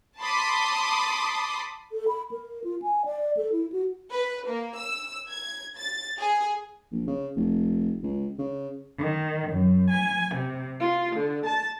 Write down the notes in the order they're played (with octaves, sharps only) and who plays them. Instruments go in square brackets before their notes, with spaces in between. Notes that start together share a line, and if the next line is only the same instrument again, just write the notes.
[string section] A5 B5 C6 D6 D#6
[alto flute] A4
B5
A#4
F4
G#5
D5
A4
E4
F#4
[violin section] B4
A#3
E6
G#6
A6
G#4
[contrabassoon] A#1
C#3
F1
C#2
C#3
[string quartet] D#3
F#2
G#5
C3
F4
D3
A5